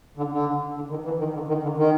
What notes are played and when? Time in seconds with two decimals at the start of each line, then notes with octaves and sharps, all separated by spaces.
0.17 D3
0.32 D3
0.75 D3
0.90 D#3
1.04 E3
1.19 D#3
1.34 D3
1.48 D#3
1.63 D3
1.77 D#3